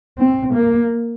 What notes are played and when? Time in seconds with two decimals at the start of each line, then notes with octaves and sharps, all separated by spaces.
0.18 C4
0.54 A#3